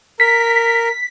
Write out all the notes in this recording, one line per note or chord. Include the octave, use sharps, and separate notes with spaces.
A#4 B6